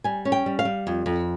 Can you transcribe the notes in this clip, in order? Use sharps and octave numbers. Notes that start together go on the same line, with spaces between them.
G3 G#5
C#4
G5
G3
F5
G3
F2
F2